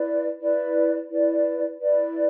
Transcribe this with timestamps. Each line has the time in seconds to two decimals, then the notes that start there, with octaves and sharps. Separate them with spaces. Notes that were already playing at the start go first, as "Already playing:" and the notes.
Already playing: E4 B4 D5
0.41 E4 B4 D5
1.10 E4 B4 D5
1.79 E4 B4 D5